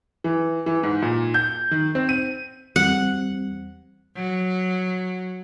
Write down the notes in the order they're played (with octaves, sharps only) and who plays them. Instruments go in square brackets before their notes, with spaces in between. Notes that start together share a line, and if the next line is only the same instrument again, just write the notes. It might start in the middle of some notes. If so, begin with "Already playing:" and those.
[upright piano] E3
E3
G#2
A#2
G6
D#3
C4
D#7
[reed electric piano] E2 G3 C4 [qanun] F#5
[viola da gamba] F#3